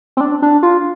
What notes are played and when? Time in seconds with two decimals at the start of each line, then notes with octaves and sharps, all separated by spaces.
0.17 C4
0.21 D4
0.42 D4
0.63 F4